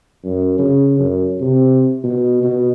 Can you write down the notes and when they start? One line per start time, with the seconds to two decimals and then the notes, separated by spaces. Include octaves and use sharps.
0.24 F#2
0.58 C#3
0.99 F#2
1.41 C3
2.04 B2
2.43 B2